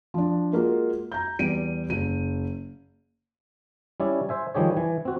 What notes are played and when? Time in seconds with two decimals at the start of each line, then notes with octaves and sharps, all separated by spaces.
0.14 F3 D4
0.52 G#3 A#3 F4 F#4 G#4
1.12 A#5 G6
1.39 E2 G3 D7 D#7
1.90 F#1 D#7
4.00 G3 C#4 E4 C#5 D5
4.29 C5 E5 G#5
4.55 D#3 F3 G3 G4 G#4 C#5
4.77 E3 G#5
5.05 C4 F#4